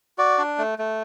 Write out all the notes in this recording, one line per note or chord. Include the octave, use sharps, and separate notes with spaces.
F#4 D5
D4
A3
A3